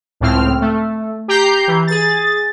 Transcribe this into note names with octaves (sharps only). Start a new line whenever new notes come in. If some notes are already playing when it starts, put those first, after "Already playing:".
C#2 A2 C4 F6
A3
G4 A#5 G6 C7
E3
G#4 A6